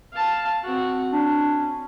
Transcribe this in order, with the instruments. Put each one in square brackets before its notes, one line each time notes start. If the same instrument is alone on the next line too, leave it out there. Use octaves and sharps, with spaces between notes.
[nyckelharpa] F5 A5
C4 F#4
[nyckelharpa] C#4 [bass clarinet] D4